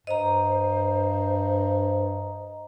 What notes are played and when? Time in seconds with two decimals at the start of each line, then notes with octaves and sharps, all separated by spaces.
0.07 G2 C5 D#5 A#5